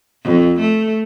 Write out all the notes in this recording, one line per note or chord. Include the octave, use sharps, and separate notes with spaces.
F2
A3